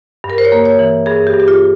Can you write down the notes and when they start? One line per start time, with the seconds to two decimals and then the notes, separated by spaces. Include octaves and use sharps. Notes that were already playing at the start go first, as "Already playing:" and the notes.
0.24 G2
0.30 A#4
0.38 C5
0.45 C#5
0.52 A#3
0.65 C#5
0.79 E3
1.06 G2 G#4
1.27 G4
1.34 G2
1.40 G4
1.48 F4